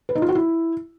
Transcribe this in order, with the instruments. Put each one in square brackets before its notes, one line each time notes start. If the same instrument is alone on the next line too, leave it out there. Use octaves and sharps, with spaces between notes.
[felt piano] B4
D#4
F4
F#4
E4